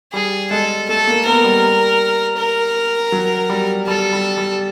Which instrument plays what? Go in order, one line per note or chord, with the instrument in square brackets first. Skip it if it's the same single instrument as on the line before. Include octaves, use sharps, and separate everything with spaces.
[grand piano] G3 [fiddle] G#4
[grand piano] G#3 [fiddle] A4
[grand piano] A3 [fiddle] A4
[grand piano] A#3
[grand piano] B3 [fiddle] A#4
[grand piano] G3
[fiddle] A#4
[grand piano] F#3
G3
[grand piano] G3 [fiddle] A4
[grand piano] G3
G3